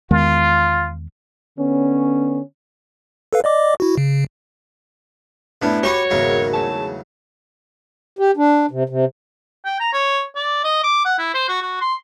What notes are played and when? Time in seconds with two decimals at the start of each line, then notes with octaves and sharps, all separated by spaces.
0.11 E2 D#3 G#3 F4
1.59 D3 B3 C#4
3.33 A4 B4 F5
3.44 D5 D#5 D6
3.80 E4 F#4
3.98 C#3
5.62 A2 B3 C#4 D4 E4
5.83 F#4 G4 B4 C#5
6.10 G#1 E2 C#3 F#3 A#3 A#4
6.53 A3 C#5 A5
8.19 G4
8.37 D4
8.71 C3
8.89 C3
9.65 G5
9.80 A#5
9.93 C#5
10.36 D5
10.64 D#5
10.84 D6
11.05 F#5
11.18 E4
11.34 C5
11.48 F#4
11.62 F#4
11.81 C6